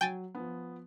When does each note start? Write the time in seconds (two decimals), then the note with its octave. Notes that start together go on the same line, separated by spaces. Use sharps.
0.01 F#3 G5 G#5 A6
0.35 F3 B3